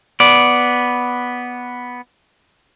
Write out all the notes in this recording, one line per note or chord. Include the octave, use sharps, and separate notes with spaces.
B3 D5